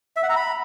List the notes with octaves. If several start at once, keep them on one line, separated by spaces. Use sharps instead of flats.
E5
F#5
A#5
B5